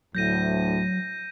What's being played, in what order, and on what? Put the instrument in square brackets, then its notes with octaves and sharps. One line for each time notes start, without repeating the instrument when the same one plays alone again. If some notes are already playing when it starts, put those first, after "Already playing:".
[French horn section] D2 A2 [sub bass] F#3 [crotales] G6 A#6 D#7